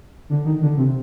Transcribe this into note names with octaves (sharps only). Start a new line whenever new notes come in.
D3
D#3
D3
C3